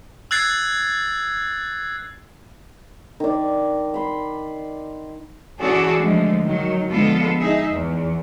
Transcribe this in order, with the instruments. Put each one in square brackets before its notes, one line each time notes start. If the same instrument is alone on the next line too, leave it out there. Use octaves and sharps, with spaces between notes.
[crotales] E6 F#6 G#6 A6 C7
[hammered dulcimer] D#3 D5
B5 C6
[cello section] E3 C#4 F#4 G#4 A4 D5
D3 F3 G#3 A3
D#3 F#3
D3 F3 G#3 B3 F4 A4
D#4 G#4 E5
E2